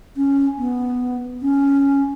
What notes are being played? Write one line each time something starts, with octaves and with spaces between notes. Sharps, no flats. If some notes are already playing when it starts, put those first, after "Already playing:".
C#4
B3
C#4